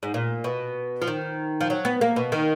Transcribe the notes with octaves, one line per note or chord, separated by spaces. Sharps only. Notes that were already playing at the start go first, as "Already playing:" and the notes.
G#2
A#2
B2
F3
D#3
F3
F#3
B3
A#3
B2
D#3